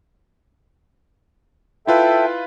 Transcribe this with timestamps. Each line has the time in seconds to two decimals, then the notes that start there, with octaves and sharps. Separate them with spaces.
1.87 E4 F4 A4 B4 E5 G5